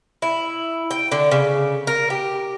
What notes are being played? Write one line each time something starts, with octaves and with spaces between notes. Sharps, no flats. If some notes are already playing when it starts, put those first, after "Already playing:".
E4
G5
D3
C#3
A#4
G4